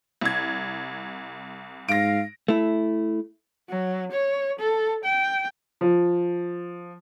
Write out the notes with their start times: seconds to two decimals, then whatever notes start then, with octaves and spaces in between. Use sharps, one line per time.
0.21 C2 G#6
1.89 G#2 F5 A#6 D7
2.48 A3 E4
3.69 F#3
4.12 C#5
4.59 A4
5.04 G5
5.81 F3